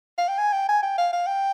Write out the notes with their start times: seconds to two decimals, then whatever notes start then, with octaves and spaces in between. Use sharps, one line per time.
0.18 F5
0.28 G5
0.38 G#5
0.53 G5
0.68 G#5
0.82 G5
0.98 F5
1.13 F5
1.27 G5